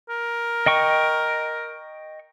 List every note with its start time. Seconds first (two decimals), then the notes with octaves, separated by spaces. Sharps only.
0.09 A#4
0.66 D#5 G5 C#6